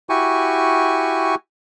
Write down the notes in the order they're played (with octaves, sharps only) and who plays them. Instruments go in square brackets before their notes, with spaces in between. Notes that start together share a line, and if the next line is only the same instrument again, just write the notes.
[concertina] E4 F#4 G4 G#5 C#6